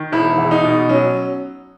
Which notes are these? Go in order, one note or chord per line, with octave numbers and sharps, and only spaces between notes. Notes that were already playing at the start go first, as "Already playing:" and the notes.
Already playing: D#3
E1 E4
E2
D#4
B2
F#3 C#4